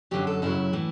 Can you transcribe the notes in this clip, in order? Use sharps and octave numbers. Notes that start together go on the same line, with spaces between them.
F#2 D3 F#3 G4
A4
F#2 C#3 F#3 E4
A2 E3